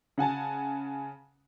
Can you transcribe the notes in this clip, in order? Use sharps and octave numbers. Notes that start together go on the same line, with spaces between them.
C#3 F#5 G#5 A5